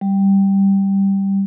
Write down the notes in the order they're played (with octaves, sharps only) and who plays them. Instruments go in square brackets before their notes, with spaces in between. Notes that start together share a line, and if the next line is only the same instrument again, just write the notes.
[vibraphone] G3